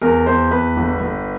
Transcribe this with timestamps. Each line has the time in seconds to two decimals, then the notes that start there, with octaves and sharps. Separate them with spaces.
0.02 E2 A#4
0.26 E2 C5
0.51 E2 B4
0.76 G1
1.01 G1